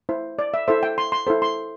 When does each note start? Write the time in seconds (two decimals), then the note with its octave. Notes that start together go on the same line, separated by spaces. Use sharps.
0.09 E4 C5
0.39 D5
0.54 E5
0.68 E4 A4 C5 E5
0.83 G5
0.98 C6
1.12 C6
1.27 E4 A4 C5
1.42 C6